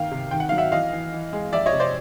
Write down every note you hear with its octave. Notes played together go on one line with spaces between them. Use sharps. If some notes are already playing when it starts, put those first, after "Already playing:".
Already playing: D#3 A#3 F5 G5
C3
D#3 G5
F#5
F#3 F5
E5 F#5
E3 D#5 F5
E3
E3
G#3
F2 D5 E5
C#5 D#5
C3
C5 D5